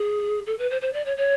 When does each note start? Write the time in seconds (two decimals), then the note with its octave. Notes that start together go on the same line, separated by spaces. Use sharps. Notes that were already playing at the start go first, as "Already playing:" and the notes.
Already playing: G#4
0.46 A4
0.58 B4
0.70 C5
0.81 C5
0.93 D5
1.05 C#5
1.17 C#5